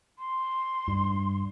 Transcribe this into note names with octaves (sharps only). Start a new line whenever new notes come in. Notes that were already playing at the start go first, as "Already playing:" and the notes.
C6
G2